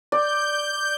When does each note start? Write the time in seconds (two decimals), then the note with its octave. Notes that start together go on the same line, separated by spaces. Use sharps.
0.12 D5 G6